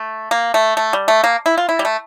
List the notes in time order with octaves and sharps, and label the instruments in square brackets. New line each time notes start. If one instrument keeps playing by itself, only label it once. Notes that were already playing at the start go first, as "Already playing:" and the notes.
Already playing: [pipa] A3
A#3
A3
A3
G3
A3
A#3
E4
F4
E4
G3
A3